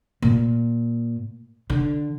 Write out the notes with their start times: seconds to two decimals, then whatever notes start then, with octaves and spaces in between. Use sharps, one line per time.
0.22 A#2
1.70 D3